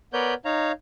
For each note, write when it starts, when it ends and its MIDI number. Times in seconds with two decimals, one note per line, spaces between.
0.13 0.34 59
0.13 0.34 70
0.13 0.34 71
0.13 0.34 73
0.13 0.34 74
0.13 0.34 91
0.45 0.72 63
0.45 0.72 73
0.45 0.72 77
0.45 0.72 82